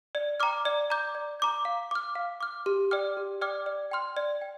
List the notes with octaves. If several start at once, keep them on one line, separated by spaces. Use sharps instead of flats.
D5
G5 A#5 D6 F6
D5
A#5 D6 G6
D5
A#5 D6 G6
F5
D6 F6
F5
D6 F6
G4
D5 G5 D6 F6
G4
D5 G5 D6 F6
D5
G5 C6 F6
D5
G5